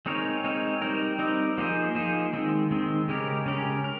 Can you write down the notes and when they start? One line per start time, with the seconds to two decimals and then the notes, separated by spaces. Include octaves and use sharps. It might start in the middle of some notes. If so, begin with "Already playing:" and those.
0.06 G#3 C4 D#4 A#4 C#5
0.44 G#3 C4 D#4 A#4 C#5
0.82 G3 C4 D#4 A#4
1.19 G3 C4 D#4 A#4
1.58 F3 A#3 D#4 G#4 C5
1.95 F3 A#3 D#4 G#4 C5
2.33 D#3 G#3 C4
2.71 D#3 G#3 C4
3.08 C#3 G#3 C#4 G4 A#4
3.46 C#3 G#3 C#4 G4 A#4
3.84 A#4